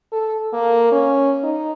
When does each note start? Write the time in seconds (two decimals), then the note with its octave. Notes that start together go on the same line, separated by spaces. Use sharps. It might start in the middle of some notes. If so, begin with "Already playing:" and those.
0.12 A4
0.53 A#3
0.91 C#4
1.43 D#4